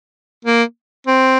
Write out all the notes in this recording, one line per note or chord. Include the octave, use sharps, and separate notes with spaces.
A#3
C4